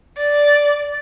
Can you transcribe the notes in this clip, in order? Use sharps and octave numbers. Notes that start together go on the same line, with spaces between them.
D5